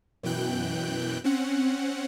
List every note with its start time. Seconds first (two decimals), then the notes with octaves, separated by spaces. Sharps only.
0.23 F#2 B2 E3 G5 F#6 G6
1.24 C4 C#4 F#5